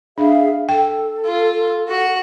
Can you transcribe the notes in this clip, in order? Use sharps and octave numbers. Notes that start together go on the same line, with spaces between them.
D4 G#4 E5 F5
A4 G5
F4
F#4 F#5